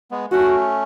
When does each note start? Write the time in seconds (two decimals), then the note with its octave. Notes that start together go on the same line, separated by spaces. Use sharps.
0.11 G#3 B3
0.32 A3 C#4 F#4